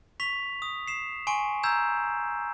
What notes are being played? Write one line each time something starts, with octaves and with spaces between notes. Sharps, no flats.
C#6 B6 F7
D#6
C7 E7
G#5 C6 C#6 D7
A#5 E6 G6 G#6 E7